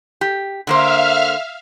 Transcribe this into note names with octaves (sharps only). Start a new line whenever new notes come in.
G4
D3 A#3 C5 E5 F5 F6